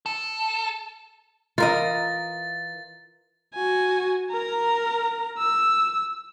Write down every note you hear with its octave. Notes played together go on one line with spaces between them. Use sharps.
A4
E3 F4 A#4 D#5 A6
F#4 G#5
A#4 A#5
E6